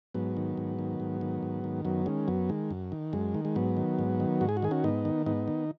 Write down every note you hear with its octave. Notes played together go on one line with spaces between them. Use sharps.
G#2 F#3 B3
D#3
G#2
D#3
G#2
D#3
G#2
D#3
F#2 F#3 B3
D#3 G#3 C#4
F#2 F#3 B3
D#3 G#3
F#2
D#3
F#2 G#3
D#3
G#3
G#2 F#3 B3
D#3
G#2
D#3
G#2 F#4
G#4
F#4
D#3 G#4
C#4 F#4
G#2 B3 D#4
D#3
G#2 B3 D#4
D#3